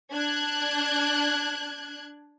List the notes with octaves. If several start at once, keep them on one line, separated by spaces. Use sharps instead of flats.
D4 F#6 G#6